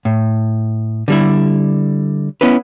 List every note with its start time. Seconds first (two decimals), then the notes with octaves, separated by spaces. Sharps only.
0.05 A2
1.08 D3 G3 E4
2.41 B3 C#4 E4 B4